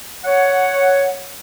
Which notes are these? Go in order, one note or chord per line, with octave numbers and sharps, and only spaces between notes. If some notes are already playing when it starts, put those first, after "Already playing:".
C#5 F#5